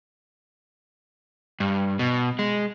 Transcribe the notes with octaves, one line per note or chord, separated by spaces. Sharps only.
G2
B2
G#3